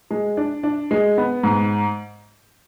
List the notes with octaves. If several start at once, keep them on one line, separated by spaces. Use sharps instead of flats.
G#3
D4
D4
G#3
B3
G#2